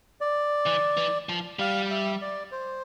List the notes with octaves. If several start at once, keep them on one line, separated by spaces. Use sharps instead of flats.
D5
E3
E3
F3
G3 F5
E5
D5
C5